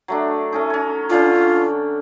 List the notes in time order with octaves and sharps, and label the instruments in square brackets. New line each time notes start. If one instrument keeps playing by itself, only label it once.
[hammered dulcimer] F#3 A3 D4
A3 C#4 D#4
C#4 C#5
[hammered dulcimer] D3 C#4 D4 [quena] F4